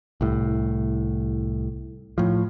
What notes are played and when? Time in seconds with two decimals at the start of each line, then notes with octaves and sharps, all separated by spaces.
0.21 C2 A2
2.18 A2 F3